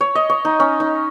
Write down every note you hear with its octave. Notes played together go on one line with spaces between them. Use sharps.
C#5
D#5
C#5
D#4
C#4
D#4